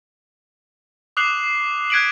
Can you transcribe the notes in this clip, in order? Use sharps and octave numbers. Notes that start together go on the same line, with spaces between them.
D6 D#6 F#6 C7 F7 F#7
F#6 G#6 B6 D7 D#7 F#7